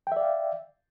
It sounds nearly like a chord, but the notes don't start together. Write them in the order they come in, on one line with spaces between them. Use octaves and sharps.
G5 E5 D5 F5